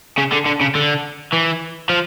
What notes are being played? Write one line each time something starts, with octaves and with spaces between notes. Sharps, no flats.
C#3
D3
D3
C#3
D3
E3
F3